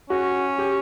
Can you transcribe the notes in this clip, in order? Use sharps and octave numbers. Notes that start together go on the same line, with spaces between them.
C#4 F#4
G4